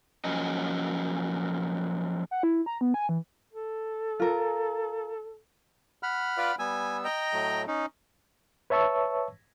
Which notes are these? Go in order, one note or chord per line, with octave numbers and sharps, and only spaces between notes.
F3 F#3 A#3 C#4 D#5
F#5
E4
A#5
B3
G#5
E3
A4
F4 A#4
F#5 B5 F6
F4 B4 D5
G3 B3 G#5 E6
D#5 G5 A#5
A2 F#3 A3
C#4 D#4
B4 C#5 E5 A5 C#6 E6